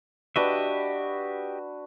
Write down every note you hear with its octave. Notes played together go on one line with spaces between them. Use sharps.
D4 F#4 G4 B4 D#5 E5